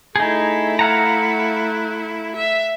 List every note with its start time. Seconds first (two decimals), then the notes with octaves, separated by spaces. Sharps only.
0.16 A3 D#4 E4 G#4
0.79 F5 F#5 A#5
2.35 E5